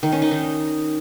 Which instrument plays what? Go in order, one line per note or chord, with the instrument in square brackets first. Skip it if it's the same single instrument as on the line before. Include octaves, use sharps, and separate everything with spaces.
[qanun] D#3
C#4
D#4
D#3